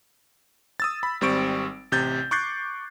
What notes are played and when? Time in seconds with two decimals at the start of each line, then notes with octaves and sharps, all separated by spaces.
0.80 D#6 E6 A6
1.03 B5
1.21 G#1 G3 C4 C#6 D7
1.92 A1 C3 G6 A6
2.31 C#6 D6 F#6 G6 A6 C7